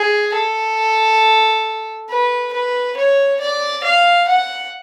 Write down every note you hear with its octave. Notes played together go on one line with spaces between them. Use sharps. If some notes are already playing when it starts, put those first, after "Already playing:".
Already playing: G#4
A4
B4
B4
C#5
D5
F5
F#5